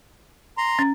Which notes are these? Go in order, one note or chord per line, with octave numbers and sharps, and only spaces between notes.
A#5 C6
C#4